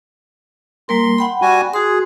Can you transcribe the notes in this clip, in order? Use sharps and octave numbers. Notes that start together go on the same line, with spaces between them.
G3 A#3 A#4 C6
F#5 G5 B5
G3 F#4 G#5
F#4 G#4 C6